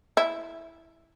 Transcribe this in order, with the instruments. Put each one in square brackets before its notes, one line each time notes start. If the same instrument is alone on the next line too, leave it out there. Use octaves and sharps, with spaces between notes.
[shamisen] E4